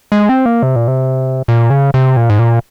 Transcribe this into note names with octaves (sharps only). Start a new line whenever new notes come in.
G#3
C4
A#3
C3
A#2
C3
A#2
C#3
C3
A#2
G#2
A#2